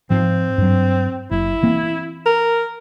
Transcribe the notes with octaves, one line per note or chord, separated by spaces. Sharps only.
G#2 F3 C4
G2 F#3
F#1 E4
E3 A#3 C4
A#4